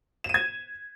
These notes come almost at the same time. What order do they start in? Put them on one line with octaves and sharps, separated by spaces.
E7 D#7 G#6